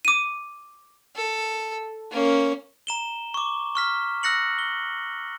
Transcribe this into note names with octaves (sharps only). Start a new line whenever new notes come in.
D6 D#7
A4
A#3 C#4
A#5 E7 G7
C#6 D6
C#6 F6 B6
E6 F#6 A#6 C#7 F#7
G7